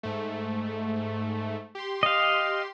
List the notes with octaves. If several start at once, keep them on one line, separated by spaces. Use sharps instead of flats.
G#2 A3
G4 C6
D#5 F5